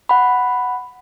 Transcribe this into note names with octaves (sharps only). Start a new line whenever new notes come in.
F#5 B5